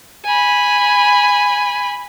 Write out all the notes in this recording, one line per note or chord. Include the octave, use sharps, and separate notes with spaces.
G#5 B5